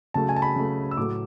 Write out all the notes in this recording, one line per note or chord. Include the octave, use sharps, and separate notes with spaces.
C#3 F#3 A3 A5
G#5
A5
B5
C#3 F#3 A3
E6
A2 F#3 A3 D6